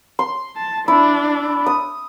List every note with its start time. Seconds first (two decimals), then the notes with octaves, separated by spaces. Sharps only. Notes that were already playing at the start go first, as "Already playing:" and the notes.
0.19 C6
0.56 A5
0.88 D4 E4
1.66 D#6